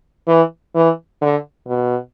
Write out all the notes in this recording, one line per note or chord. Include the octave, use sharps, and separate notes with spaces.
E3
E3
D3
B2